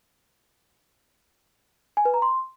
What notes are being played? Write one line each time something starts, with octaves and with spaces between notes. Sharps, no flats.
G#5
B4
A#5
C6